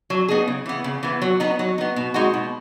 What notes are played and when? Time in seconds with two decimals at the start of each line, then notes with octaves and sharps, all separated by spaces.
0.10 F#3
0.28 B3 D#4 G#4
0.48 C#3
0.66 E3 B3
0.84 C#3
1.03 E3 B3
1.22 F#3
1.40 B3 D#4
1.59 F#3
1.78 B3 D#4
1.96 B2
2.14 G#3 D#4 F#4
2.34 B2